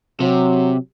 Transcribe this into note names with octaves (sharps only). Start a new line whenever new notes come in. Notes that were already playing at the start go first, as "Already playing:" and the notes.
C3 F#3